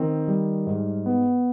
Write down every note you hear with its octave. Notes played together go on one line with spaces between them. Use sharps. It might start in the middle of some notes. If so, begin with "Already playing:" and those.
Already playing: D#3 C4
G3
G#2
B3